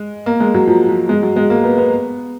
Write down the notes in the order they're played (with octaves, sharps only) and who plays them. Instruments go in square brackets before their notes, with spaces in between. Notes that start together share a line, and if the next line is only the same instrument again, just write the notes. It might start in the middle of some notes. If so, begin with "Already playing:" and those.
Already playing: [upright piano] G#3
A#3
G#3
F#3
F3
F3
G#3
F#3
G#3
A#3
B3
B3